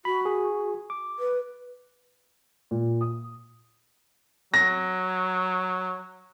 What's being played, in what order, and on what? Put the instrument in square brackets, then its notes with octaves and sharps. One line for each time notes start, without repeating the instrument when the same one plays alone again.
[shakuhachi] F#4 [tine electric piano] B5
[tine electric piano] G#4
D6
[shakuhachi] B4
[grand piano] A#2
D#6
[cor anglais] F#3 [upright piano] A#6